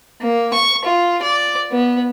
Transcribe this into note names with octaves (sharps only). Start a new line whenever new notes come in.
A#3
C#6
F4
D5
B3